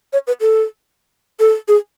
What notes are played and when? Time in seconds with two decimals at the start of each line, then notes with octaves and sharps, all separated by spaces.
0.13 C#5
0.27 B4
0.41 A4
1.40 A4
1.68 G#4